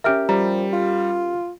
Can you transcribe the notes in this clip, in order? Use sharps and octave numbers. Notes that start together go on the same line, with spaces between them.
C#4 G4 A#4 E5 F6 D7
F3 G3 A#5
F4